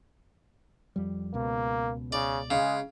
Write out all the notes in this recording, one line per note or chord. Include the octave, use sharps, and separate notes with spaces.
F2 G3
C#2 B2 A#3
C#3 D5
C#3 G#3